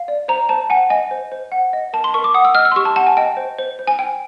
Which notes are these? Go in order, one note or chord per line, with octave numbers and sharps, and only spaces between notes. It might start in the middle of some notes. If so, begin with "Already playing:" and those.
Already playing: F5
D5
C5 A#5
C5 A5
F#5 G#5
D#5 G#5
C5
C5
F#5
D#5
A#4 A5
C6
A#4 C#6
D6
F#5 D#6
E6
D#5 F6
E6
C6
G4 C#6
A5
F#5 A5
G#5
D#5 G5
C5
C5
C5
G#5
G5